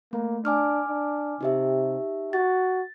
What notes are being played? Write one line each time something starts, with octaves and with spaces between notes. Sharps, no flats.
A3 A#3
D4 G#5 D6 F6
D4
C3 D#4 G4 E5
F#4 A6